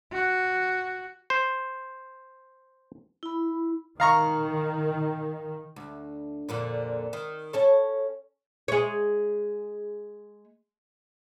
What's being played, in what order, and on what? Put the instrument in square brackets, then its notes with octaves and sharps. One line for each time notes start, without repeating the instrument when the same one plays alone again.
[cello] F#4
[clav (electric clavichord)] C5
[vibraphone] E4 B5
[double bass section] D#3 [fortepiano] F5 A#5 C#6
[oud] D2
F2 A#2 D3
D#3
C#4 A4 C#5
G#3 C#5